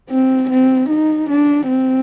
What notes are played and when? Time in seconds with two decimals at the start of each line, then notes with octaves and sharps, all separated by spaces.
0.10 C4
0.50 C4
0.89 D#4
1.29 D4
1.68 C4